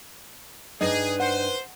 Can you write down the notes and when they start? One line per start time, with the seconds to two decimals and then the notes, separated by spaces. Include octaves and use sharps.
0.81 G2 D4 D#4 G#4 B4 D#5
1.20 C5 F#5